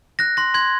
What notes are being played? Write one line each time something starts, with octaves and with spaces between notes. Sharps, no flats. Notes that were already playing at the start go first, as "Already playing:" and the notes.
F#6 A#6
C6 A#6
C6 G#6